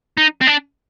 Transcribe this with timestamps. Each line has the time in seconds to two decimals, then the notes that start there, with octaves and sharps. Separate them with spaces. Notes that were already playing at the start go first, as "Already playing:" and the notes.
0.17 D#4
0.41 C4
0.47 D4